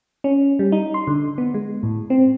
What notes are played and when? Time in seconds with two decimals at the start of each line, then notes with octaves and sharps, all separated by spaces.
0.24 C#4
0.59 G3
0.72 D#4
0.94 C6
1.07 D3
1.38 B3
1.54 G#3
1.83 A2
2.10 C4